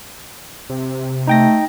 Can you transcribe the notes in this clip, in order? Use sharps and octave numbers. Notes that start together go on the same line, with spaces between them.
C3
A3 D#4 G5 A#6